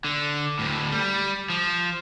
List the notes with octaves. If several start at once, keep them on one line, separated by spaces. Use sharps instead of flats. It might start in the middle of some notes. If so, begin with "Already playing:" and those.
D3
D2 A2
G3
F3